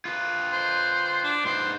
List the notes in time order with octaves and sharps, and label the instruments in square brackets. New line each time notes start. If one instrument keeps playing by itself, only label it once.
[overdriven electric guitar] F4 B4
[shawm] C5
D4
[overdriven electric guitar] G#2 B4 [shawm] C5